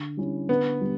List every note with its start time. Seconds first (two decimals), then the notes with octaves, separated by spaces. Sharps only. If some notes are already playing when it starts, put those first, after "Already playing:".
Already playing: D3
0.17 G3 C#4 E4
0.49 D3 B3
0.81 G3 B3